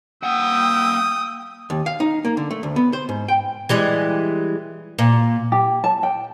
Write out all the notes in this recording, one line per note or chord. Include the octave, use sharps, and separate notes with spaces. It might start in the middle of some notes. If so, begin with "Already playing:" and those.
A#3 F#5 G5 D#6 E6
D#2
F5
D#4
A#3
D3
A3
D2
B3
C5
G#2
G5
E3 G3 G#3
A#2
G4
A5
G5